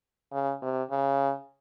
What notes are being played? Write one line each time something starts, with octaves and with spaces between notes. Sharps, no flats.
C#3
C3
C#3